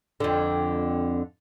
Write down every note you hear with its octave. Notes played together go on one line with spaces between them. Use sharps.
F2 D3